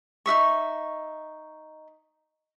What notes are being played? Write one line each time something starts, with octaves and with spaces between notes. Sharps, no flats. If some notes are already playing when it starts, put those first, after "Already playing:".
D#4 F#4 E5 C#6